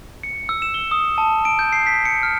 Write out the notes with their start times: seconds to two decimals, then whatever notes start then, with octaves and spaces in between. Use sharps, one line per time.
0.23 C#7
0.49 E6
0.62 E7
0.74 G7
0.91 D#6
1.18 A5
1.45 D7
1.59 G6
1.73 C7
1.87 B6
2.05 C#7
2.23 F6